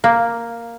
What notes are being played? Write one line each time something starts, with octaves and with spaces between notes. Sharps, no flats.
A#3